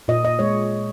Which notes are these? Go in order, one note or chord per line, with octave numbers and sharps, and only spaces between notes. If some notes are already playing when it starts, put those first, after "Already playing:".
A#2 D#5
D#5
G#3 C#5